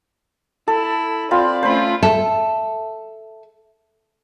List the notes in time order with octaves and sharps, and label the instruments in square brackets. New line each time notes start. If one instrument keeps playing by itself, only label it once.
[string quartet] E4 [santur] A4
[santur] C4 F4 B5 [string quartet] D5
[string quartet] A3 C#4 F4 [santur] C5 B5
[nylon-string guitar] A4 E5